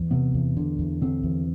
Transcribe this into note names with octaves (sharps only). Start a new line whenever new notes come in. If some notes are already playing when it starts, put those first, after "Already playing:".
Already playing: E2
C3 B3
E2
D3
E2
D3 C4
E2